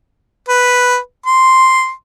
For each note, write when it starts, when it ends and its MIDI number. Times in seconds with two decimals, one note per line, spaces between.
0.49 0.97 71
1.26 1.91 84